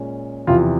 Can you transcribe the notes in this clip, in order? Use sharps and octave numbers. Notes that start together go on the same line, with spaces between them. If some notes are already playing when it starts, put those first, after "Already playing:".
Already playing: A#2 G#3 C#4
E2 C3 F3 F4